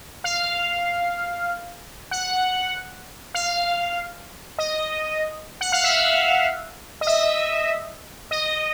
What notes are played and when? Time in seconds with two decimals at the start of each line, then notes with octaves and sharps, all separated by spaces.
0.24 F5
2.11 F#5
3.35 F5
4.58 D#5
5.61 F#5
5.72 F5
5.84 E5
7.01 D#5
7.07 E5
8.31 D#5